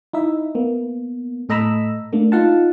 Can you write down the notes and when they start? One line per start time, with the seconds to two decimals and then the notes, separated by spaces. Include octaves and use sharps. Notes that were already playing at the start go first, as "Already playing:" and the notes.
0.13 D#4 E4 E5
0.55 A#3 B3
1.49 A2 A4 D#5 A#5 B5 E6
2.13 A3 A#3 D4
2.32 D#4 F4 F5 F#5 A5